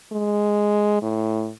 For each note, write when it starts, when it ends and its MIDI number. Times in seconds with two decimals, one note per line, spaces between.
0.12 1.01 56
1.02 1.52 45